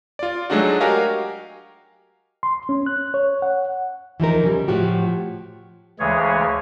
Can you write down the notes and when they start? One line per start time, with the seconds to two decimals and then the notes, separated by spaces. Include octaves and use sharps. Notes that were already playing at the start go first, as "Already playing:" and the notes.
0.19 F4 D5
0.50 F#3 G#3 A3 D4 D#4 F#4
0.80 F#4 G4 A#4 D#5 F5 G#5
2.43 C6
2.69 C#4
2.86 F#6
3.14 C#5
3.42 F#5
4.20 E3 F3 D#4 A#4
4.44 C#3 G3
4.68 A2 F3 F#4 G4
5.99 D2 C#3 E3 G#3 G#4 C#5